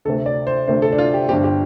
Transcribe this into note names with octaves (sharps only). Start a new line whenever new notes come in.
D2 C3 A3 A4
D5
C5
D2 C3 A3 C5
A4
D4
F4
G4
G1 G2 G3 C4 G4
G4